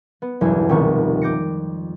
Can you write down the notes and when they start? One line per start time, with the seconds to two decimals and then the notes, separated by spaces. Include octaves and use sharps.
0.22 B3
0.41 F#1 B1 E2 G2 G#3 G#6
0.69 D#1 C2 F2 B2 D#3 C#6
1.21 D6 G6 A#6 C#7